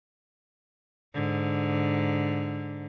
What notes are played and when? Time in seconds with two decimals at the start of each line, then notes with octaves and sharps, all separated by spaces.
1.14 G#2 D3